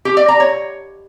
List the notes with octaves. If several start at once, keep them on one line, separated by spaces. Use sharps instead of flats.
G4
D5
A#5
C#5